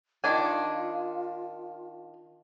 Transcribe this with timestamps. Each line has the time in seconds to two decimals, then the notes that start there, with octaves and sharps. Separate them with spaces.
0.24 D#3 D4 F4 G#5